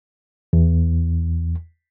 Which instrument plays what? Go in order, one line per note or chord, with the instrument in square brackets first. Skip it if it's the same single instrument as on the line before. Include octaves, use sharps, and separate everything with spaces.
[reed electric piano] E2